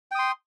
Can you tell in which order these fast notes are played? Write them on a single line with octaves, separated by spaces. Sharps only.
G5 D#6 C6